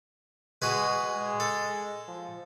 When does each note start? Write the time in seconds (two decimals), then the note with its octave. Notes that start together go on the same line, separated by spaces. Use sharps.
0.62 G#3 F#4 G#4 B4
1.05 G#3
1.40 A4
2.08 F3